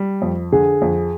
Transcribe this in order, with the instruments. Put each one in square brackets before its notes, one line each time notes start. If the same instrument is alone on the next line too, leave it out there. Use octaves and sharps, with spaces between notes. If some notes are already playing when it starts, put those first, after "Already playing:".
Already playing: [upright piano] G3
F2
[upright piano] D3 [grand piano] G#4
[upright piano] F2